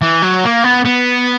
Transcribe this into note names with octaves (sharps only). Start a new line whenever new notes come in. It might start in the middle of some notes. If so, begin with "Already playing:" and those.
E3
F#3
A#3
B3
B3